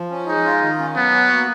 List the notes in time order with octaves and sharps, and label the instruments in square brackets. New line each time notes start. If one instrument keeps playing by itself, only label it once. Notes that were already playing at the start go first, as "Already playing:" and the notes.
Already playing: [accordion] F3
C#4
[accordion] G#3 [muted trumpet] D#4
[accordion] F4
D#3
C#4
[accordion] F#3 [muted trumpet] B3
[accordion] F#4
A#3